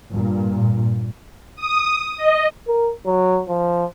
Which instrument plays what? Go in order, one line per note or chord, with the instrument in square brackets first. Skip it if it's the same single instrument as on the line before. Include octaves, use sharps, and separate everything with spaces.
[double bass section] G2 A#2
[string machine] D#6
D#5
[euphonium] A#4
F#3
F3